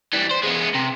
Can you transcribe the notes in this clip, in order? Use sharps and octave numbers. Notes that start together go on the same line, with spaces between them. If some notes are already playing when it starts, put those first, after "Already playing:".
E3 G3
C5
G#3 B3
C3